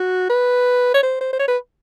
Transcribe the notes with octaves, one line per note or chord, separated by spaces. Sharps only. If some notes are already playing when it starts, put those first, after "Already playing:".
Already playing: F#4
B4
C#5
C5
C5
C5
C#5
B4